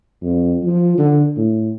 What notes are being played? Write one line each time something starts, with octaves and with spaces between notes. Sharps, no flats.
F2
F3
D3
A2